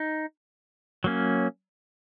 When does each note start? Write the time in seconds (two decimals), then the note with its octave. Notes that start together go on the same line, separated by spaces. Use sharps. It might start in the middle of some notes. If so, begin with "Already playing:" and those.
Already playing: D#4
1.04 F#3 A#3 C#4